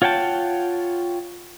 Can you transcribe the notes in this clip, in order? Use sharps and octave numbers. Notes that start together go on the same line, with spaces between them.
F4 C#5 F#5 G5 A5